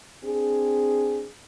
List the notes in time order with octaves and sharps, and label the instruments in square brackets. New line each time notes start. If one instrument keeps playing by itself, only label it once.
[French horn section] C4 D4 G#4